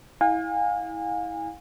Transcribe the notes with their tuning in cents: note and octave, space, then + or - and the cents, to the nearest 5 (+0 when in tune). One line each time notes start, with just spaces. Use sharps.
E4 -20 F5 +35 G#5 -30